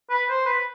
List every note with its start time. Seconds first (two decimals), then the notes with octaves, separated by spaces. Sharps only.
0.10 B4
0.29 C5
0.46 B4